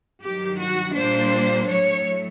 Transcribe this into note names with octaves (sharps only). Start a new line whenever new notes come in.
G2 D#3 F#3 G4
F#4
A#2 G3 A#3 D4 C5
A2 F#3 A3 C#5